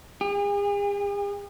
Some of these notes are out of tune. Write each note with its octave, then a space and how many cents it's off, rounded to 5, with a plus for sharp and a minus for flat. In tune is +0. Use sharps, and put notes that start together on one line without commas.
G#4 -45